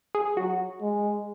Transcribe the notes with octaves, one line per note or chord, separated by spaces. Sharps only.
G#4
F#3 F#4
G#3